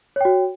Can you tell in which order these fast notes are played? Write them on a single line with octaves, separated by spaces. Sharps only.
C#5 G5 F#4